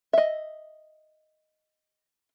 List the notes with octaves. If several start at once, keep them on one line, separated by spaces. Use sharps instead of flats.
D#5 E5